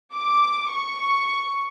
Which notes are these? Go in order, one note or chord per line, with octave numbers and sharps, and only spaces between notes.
D6
C#6